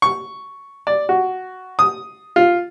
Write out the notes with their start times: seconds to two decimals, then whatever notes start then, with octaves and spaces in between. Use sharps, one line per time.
0.02 C#6
0.87 D5
1.09 F#4
1.79 D#6
2.36 F4